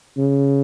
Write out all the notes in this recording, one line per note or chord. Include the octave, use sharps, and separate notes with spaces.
C#3